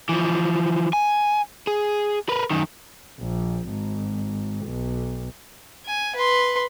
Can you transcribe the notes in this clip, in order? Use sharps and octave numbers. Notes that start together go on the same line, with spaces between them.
E3 F3
G#5
G#4
A#4 B4
F#2 D#3
A#1
G#1
B1
G#5
B4 C6